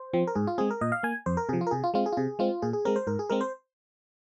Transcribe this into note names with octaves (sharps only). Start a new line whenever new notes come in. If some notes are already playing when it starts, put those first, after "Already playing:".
Already playing: C5
F3 C4
A#4
G#2 G#4
F4
G#3 C4 G#4
A#4
A#2 D#5
F5
A#3 G#5
F2 C5
A#4
C3 F3 G#4
F4
A#4
C3 G#4
F4
G#3 C4 F4
G#4
F4
C3 G#4
G#3 C4 F4
A#2 G#4
G#4
G#3 C4 A#4
C5
G#2 A#4
G#4
G#3 C4 A#4
C5